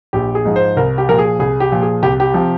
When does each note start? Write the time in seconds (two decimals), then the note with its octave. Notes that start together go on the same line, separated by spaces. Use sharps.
0.13 A#1 G4
0.35 G#4
0.45 G#2 F3
0.56 C5
0.77 C2 A#4
0.98 G4
1.09 A#2 F3 A#4
1.19 G#4
1.39 C2 G#4
1.60 G4
1.72 A#2 F3
1.82 G#4
2.03 C2 G4
2.20 G4
2.34 C3 F3